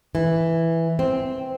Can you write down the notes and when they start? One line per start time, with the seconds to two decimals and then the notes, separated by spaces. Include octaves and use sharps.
0.15 E3
0.99 C4